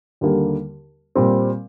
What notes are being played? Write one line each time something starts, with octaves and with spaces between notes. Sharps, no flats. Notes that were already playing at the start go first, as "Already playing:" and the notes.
D#2 D3 G3 A#3
A#2 G3 C4